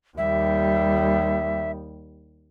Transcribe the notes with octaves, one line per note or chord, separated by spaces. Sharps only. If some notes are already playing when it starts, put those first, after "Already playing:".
D#2 G3 E5